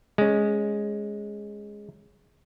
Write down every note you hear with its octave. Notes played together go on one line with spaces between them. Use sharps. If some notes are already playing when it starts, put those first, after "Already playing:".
G#3 C#4